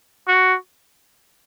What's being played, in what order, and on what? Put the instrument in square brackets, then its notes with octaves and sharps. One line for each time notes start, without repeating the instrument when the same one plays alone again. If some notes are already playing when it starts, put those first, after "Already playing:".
[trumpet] F#4